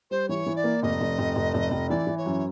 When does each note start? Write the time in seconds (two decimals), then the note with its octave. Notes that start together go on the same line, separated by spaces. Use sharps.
0.10 G3 C5
0.28 E3 C#5
0.46 E3
0.55 D5
0.64 A#3
0.82 F1 D#5
1.01 F1
1.19 F1
1.36 F1
1.54 F1
1.71 F1
1.89 E3 D5
2.07 E3
2.17 C#5
2.26 F#2